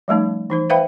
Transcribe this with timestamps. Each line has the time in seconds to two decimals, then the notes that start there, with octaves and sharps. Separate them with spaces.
0.08 F3 G3 A3 C#4 D#4
0.50 E3 D#4 C5
0.70 B4 C5 E5 F5 G5 B5